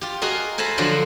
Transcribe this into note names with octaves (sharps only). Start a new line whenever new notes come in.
F4 G4
F#4 G#4 A#4 D#5 F5
A4 C5 G#5 A#5 B5
D3 F3 F#3 F#4 C5